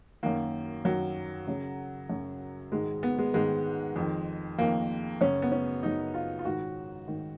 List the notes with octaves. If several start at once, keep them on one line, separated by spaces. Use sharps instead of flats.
F#2 D#3 A#3
F#2 D#3 F#3
F#2 C#3
F#2 C#3
G#2 D#3 G#3
B3
G#3
G#2 D#3 G#3
F2 D#3
F2 D#3 A#3
F#2 C#3 C#4
B3
C#4
F#2 C#3 D#4
F4
F4
G#2 D#3 F#4
G#2 D#3